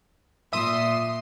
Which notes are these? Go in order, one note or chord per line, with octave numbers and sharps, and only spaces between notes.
A#2 E5 C6 D#6